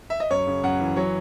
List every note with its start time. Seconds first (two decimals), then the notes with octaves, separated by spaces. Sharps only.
0.10 E5
0.20 D#5
0.30 F#2 C#5
0.47 C#3
0.63 F#2 F#5
0.80 E3
0.96 F#3 C#5